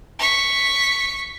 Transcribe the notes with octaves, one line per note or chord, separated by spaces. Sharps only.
C#6 B6